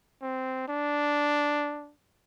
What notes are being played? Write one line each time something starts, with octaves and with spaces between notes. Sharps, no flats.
C4
D4